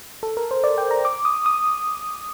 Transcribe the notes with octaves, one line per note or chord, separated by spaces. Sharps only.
A4
A#4
C5
D5
G5
A#5
D6
D#6
D#6